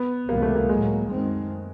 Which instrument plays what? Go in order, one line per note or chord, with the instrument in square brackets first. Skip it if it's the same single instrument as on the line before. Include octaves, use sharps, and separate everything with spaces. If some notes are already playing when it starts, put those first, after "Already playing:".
Already playing: [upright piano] B3
[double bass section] C#2 C3 E3 G3 [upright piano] A#3
[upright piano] A3
A#3
[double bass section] A2 F#3 A#3 [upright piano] G#3
[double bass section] F#2 D#3 G#3 C4